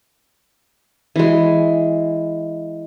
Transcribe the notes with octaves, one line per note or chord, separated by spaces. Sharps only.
E3 G#3